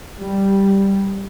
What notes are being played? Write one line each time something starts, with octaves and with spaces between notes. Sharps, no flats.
G3